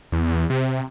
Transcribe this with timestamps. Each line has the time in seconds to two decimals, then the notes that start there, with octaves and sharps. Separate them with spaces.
0.12 E2
0.50 C3